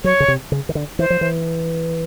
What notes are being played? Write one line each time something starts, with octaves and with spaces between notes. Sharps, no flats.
F#3 C#5
C#3
C3
C#3
D#3
D3
E3 C5
F3
E3